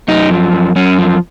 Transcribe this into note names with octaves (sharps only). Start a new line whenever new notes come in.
F#2 D#4
F3
F#2
F#2 C#4
F3